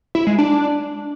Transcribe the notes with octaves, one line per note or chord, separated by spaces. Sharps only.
E4
G#3
D4